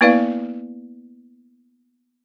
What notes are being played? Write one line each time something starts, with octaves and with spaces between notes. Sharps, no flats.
A#3 B3 E4 B4 D5 F5